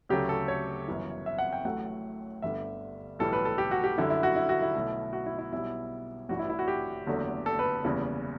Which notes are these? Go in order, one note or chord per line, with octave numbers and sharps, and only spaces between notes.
D2 C#3 F#3 A3 G4
A4
C#5
G1 F#2 E3
E5
F#5
G5
A1 A2 F#3 A3 F#5
G1 G2 D3 G3 E5
B1 A2 E3 G3 A4
B4
A4
G4
F#4
G4
F#2 D3 G3 E4
E4
F#4
E4
F#4
E4
B1 B2 A3
F#4
E4
E4
B1 B2 G3 E4
A1 G2 E3 G3 F#4
E4
E4
F#4
G4
F#1 E2 D3 F#3 A3
A4
B4
F#1 E2 C#3 E3 G3